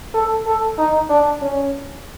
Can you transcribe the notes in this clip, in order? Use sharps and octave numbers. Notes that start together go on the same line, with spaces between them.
A4
A4
D#4
D4
C#4